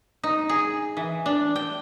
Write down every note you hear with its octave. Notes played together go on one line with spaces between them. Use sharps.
D#4
G#4
E3
D4
G5